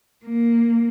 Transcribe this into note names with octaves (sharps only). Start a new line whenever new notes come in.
A#3